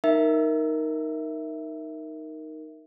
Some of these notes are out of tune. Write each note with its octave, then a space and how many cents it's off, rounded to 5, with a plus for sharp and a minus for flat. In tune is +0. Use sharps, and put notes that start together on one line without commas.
D#4 +0 A#4 +0 E5 +0